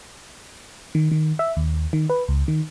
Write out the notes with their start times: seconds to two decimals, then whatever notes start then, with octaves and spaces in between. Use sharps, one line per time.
0.95 D#3
1.11 D#3
1.39 E5
1.57 D#2
1.93 D#3
2.10 B4
2.28 C#2
2.48 D#3